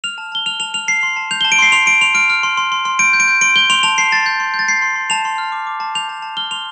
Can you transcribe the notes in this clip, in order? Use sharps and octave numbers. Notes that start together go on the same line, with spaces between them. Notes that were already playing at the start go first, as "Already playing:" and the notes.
F6 F7
A5
A5 G7
F6 F7
A5 F7
F6 F7
A5 C7
C6
A5
G6 F7
A5 G7
D7
C6 C7
C6 F7
C6 D7
C6 F7
F6 D7
F6
C6
C6
C6
C6
G6 D7
G6
D7
G6
C6 D7
G6 G7
C6 F7
A5 F7
A5 C7
A5 A6
G6
C6
G6
A6
G6 C7
C6
C6
A5 F7
C6
F6
D6
D6
A5
G6 F7
A5
A5
F6 G7
C6 F7